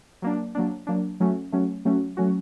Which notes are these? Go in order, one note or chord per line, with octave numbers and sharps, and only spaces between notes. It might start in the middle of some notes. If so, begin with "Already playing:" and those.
F#3 A#3 D4
F#3 A#3 D4
F#3 A#3 D4
F#3 A3 C#4 F#4
F#3 A3 C#4 F#4
F#3 A3 C#4 F#4
F#3 A3 C#4 F#4